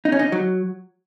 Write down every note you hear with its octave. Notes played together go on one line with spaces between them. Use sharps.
D#4
C#4
D#4
F#3